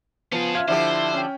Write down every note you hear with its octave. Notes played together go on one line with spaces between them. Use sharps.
F3 B3 C#4 F4 G#4
F4 E5 F6 G#6
D3 F3 E4 G4 C5
C#4 G5